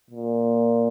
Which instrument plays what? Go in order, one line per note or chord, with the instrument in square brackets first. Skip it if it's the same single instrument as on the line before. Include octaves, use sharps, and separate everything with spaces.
[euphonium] A#2